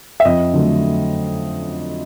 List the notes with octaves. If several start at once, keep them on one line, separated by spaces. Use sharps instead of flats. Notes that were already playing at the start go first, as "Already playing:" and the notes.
E5
F2 D#5
D3 F#3 A3